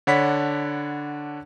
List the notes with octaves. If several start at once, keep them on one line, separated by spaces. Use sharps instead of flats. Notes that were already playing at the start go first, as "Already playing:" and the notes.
D3 D4 C#5 F#5 B5 B6